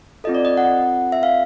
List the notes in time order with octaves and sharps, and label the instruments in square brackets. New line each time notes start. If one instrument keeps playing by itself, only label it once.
[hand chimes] C4 F4 A4 D#5
D5
D#5
F#5
E5
F5